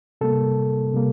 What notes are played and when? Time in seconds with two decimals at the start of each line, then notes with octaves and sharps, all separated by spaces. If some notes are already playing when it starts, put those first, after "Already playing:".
0.21 C3 G3 A#3 A4
0.94 C3 G3 A#3